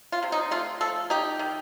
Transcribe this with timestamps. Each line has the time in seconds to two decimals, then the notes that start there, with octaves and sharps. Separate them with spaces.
0.12 F4
0.23 C3
0.32 D#4
0.51 A3 F4
0.81 F3 A4
1.10 D#4 G4
1.39 D#3